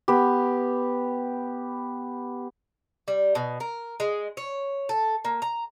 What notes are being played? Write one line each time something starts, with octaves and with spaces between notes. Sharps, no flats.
B3 G4
G3
B2
A#4
G#3
C#5
A4
A#3
A#5